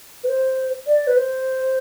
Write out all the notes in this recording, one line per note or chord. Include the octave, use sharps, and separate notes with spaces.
B4
C5
D5
B4
C5